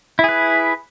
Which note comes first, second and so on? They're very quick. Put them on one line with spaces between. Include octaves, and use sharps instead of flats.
E4 G#4 B4